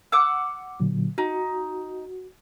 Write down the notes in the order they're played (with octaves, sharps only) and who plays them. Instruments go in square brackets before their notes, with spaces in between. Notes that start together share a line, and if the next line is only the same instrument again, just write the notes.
[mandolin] F#5 D6 E6
[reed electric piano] A#2 D3 F#3
[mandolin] D#4 [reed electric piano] F#4